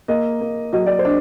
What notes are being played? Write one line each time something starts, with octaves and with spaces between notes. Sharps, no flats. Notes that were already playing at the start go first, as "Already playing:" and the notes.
A#3 D#5
A#3
F#3 D#5
D5
C5
D4